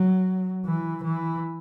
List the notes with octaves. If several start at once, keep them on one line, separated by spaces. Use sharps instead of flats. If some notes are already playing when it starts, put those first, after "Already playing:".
Already playing: F#3
E3
E3